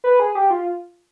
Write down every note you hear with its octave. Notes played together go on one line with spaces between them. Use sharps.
B4
G#4
G4
F4